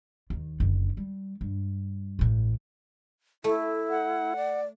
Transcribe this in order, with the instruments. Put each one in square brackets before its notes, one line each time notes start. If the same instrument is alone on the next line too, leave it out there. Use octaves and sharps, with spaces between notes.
[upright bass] D#2 D#3
F#1 D3
G3
G2
A1 A2
[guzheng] A3 [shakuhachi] E4
[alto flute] F#5
[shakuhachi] D5